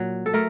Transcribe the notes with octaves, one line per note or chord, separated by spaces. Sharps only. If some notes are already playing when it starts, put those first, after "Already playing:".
Already playing: A#2 F#3
A4
A3 A#4